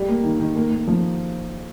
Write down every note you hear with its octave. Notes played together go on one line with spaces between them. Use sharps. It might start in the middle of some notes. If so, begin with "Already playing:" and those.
Already playing: G3
A#3
D#3
D#3
A#3
A#3
F3